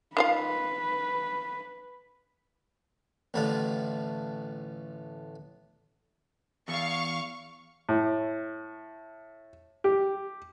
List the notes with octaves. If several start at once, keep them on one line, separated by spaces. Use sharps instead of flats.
D#3 F4 B4 F5
A1 A2 D3 F4 B5
E2 F5 C#6
A2
G4